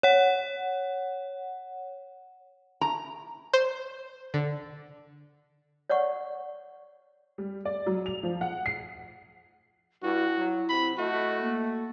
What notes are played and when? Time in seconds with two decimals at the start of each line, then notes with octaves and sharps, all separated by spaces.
0.03 C#5 F#5
2.81 A#5
3.53 C5
4.34 D3
5.90 C#5 D5 F#5 C#6
7.38 G3
7.65 D5
7.86 F#3
8.06 F7
8.23 F3
8.41 F#5
8.66 C7
10.03 G2 E4 F#4
10.38 F#3
10.69 C3 B5
10.98 A3 F#4 D#5
11.41 A#3